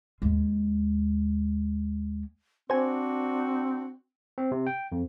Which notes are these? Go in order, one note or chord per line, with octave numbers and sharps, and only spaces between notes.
D#2 G#3
C4 D4 F#4 C5 G#5
C4
C3
G5
F2